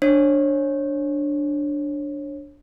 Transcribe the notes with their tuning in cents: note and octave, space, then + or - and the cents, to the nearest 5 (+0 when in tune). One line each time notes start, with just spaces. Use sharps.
D4 +0 C#5 -30